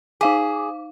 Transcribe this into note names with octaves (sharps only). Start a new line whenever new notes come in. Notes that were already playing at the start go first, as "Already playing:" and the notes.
D#4 G#4 F5 D6